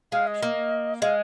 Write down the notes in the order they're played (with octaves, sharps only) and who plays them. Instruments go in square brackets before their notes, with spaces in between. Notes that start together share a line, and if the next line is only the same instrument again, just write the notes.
[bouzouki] G#3 [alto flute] F5
[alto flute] D#5
[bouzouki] A#3
[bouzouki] G#3 [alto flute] F5